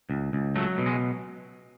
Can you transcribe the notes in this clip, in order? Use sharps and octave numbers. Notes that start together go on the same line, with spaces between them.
C#2
C#2
F#3 A3
B2
G#3